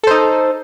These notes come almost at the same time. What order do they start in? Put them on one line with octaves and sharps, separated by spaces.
A4 C5 D#4